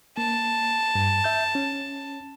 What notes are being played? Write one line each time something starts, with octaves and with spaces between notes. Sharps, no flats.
A#3 A5
G2
E5 G6
C#4